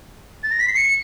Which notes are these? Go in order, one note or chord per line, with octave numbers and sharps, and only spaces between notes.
A6
A#6
B6
C7
C#7